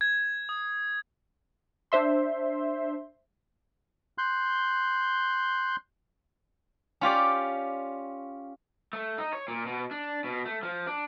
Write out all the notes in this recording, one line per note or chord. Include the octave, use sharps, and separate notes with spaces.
G#6
D#6
D4 C5 E5 C6
C6 F#6 G6
C#4 F4 G4 D5
A3
D#4
C#5
A#2
B2
D4
B2
A3
F3
D4